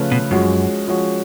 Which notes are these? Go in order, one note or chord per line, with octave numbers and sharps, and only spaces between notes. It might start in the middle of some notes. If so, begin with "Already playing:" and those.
Already playing: C#3 F3 A3 F4 B4
B2
F#2 F3 G#3 C#4 F#4
F3 G#3 C#4 F#4